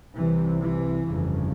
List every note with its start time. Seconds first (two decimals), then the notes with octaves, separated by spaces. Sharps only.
0.16 C2 C3 E3
0.60 E3
1.04 G1 F2 C#3